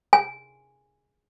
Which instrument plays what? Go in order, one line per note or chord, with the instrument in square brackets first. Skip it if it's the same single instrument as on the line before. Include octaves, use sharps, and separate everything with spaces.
[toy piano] G#5